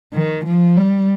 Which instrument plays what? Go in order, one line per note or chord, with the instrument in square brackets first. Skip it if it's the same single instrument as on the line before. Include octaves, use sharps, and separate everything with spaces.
[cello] D#3
F3
G3